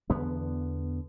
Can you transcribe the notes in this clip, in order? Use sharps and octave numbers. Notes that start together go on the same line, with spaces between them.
E2 D3 B3